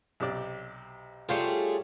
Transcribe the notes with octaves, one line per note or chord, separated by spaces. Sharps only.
B1 C3 D5
G3 A3 F4 G#4 C5 C#5